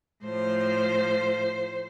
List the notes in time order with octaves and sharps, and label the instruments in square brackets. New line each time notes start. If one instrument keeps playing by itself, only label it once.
[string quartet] A2 F3 C5